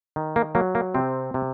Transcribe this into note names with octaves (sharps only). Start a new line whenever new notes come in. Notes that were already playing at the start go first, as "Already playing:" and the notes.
D#3
A#3
F#3 A#3
A#3
C3 C4
C3